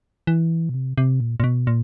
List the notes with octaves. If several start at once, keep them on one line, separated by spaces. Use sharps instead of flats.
E3
B2
C3
C3
A#2
A#2
B2
A#2